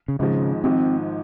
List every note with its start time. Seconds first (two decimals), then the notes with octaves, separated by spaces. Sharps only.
0.08 C#3
0.19 G#1 G#2 C#3 F3 G#3
0.64 G#1 G#2 F3 C4